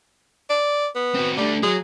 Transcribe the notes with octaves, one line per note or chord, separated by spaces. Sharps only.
D5
B3
C4 F#4
G3 A3 D4
F#3 G#4